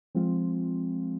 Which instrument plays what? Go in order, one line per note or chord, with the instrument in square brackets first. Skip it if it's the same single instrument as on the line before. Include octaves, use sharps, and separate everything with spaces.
[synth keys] F3 G#3 C4 F4